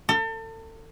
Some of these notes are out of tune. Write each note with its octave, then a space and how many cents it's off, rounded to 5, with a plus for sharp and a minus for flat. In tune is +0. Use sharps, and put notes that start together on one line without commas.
A4 +35